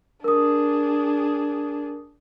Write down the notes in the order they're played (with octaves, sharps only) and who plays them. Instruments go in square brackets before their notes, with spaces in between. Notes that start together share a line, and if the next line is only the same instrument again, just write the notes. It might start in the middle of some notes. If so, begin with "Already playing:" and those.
[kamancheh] D4 G#4 [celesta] A#4 D#6